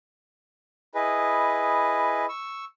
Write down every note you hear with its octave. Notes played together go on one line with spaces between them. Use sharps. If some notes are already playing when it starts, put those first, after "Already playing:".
E4 G#4 B4 D#5
C#6 E6